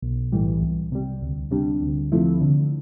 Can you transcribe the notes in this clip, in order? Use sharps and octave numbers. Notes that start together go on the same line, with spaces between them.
B1
A2 E3 G3
C2
C3 G3
D2
C3 G3 D4
D2
C3 F3 A3 E4
D3